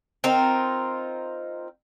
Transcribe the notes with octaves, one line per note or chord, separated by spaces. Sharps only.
C4 D#4 F4 A#4